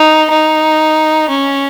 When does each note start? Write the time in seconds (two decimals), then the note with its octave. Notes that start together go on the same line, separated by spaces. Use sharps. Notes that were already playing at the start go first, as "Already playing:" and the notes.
Already playing: D#4
0.30 D#4
1.29 C#4